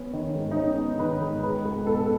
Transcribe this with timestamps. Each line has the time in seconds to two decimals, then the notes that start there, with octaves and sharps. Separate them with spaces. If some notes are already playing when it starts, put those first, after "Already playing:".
Already playing: B3 C#4
0.13 D#3
0.35 G#2
0.51 D#4
0.56 G#3 C#4
0.78 B3
0.99 D#3 B4
1.21 G#2
1.43 G#3 B4
1.65 C#2
1.86 B2 A4